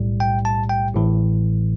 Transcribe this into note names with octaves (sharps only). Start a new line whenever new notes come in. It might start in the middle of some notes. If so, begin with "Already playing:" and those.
Already playing: B1 A2 G3
G5
A5
G5
A1 A2 E3